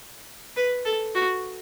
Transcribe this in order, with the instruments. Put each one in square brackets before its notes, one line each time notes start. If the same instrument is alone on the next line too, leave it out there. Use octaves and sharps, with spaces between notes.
[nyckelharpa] B4
A4
F#4